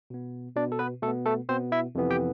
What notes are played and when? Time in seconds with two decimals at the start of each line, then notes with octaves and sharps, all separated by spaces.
0.10 B2 B3
0.56 B2 B3 D4 D5
0.72 A4
0.79 B3 B4
1.02 B2 A3 A4
1.08 B3
1.26 A3 A4
1.49 B2 B3 C4 C5
1.72 E4 E5
1.95 F2 C3 E3 B3
2.10 G4 G5